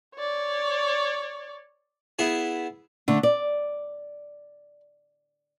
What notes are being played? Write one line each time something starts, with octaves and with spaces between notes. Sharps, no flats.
C#5 D5
B3 E4 G#4
D3 A3
D5